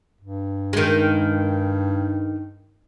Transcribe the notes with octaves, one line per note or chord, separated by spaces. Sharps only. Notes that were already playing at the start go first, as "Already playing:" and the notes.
G2
D#3 G#3